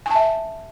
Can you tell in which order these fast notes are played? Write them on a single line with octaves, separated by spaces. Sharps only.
G#5 A5 E5